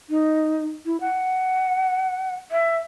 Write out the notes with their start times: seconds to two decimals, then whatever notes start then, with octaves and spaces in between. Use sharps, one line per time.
0.10 D#4
0.86 E4
1.00 F#5
2.51 E5